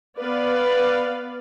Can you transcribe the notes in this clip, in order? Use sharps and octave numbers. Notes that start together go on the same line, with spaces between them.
B3 B4 D5 F5